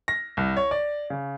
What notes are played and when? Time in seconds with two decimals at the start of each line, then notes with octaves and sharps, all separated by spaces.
0.08 A#6
0.37 C2
0.57 C#5
0.71 D5
1.10 C#3